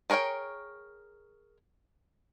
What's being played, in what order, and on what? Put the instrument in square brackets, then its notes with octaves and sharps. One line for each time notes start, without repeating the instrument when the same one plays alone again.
[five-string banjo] G#4 A#4 C#5 F5 G5